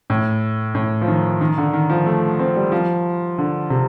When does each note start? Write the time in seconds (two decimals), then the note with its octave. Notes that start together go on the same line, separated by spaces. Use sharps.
0.10 A2
0.75 A2
1.01 F3
1.08 D#3
1.41 D#3
1.58 D3
1.73 D#3
1.90 F3
2.06 A3
2.39 C4
2.56 G3
2.72 F3
3.38 D3
3.70 C3